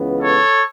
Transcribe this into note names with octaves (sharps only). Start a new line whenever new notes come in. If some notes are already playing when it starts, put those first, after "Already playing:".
Already playing: C#2 C#3 E3 B3
A4 C#5